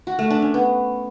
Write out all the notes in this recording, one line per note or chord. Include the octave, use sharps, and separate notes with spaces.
F#4
A3
D4
C#4
B3